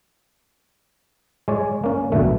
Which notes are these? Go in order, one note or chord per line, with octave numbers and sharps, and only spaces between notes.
G#3 C#5 D5
A#3 C#4
B1 B2 D3 A3